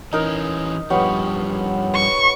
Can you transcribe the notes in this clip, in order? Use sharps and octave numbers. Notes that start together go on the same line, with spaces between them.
E3 C#4 D#4 A#4
G2 F3 B3 G4 C#5
C#6